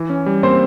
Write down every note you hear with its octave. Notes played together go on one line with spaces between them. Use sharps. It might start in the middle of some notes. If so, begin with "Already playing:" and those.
Already playing: E3
C#4
G3
A#3 C4 C5